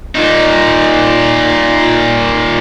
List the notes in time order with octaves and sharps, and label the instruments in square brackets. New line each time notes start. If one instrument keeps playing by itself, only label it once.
[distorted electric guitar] A#2 D#4